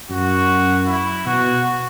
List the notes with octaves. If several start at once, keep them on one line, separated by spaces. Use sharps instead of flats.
F#2 F#4
E4
B2 F#4